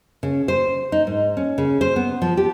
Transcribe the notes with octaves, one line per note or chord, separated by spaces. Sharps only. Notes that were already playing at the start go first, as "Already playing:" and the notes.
C#3
C5
D#4
G#2
C#4
C#3
C5
B3
F3
G4